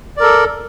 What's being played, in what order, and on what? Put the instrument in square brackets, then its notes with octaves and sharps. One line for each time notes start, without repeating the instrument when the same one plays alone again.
[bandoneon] D5
A#4
A4